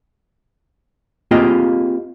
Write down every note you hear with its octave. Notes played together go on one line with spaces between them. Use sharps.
A#3 C4 F4 G4 G#4 D#5